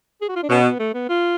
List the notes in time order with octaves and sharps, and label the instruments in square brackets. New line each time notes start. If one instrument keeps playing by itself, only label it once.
[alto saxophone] G#4
F#4
F4
D4
[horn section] B2 [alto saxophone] C#4
[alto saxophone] B3
A3
B3
F4